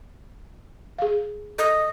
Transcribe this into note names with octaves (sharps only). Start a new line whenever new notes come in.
G#4 F5
A4 D#5